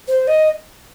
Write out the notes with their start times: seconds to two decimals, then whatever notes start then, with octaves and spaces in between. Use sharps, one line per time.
0.08 C5
0.27 D#5